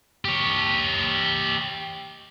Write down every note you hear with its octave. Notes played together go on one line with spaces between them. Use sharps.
G4 C#5